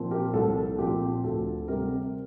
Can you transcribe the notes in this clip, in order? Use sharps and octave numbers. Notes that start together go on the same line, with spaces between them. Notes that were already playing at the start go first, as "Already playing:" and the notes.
Already playing: A#2 F3 C4
G4 A#4
C2 A4
A#2 F3 C4 G4
D2 A4
C3 G3 C4 G4 A#4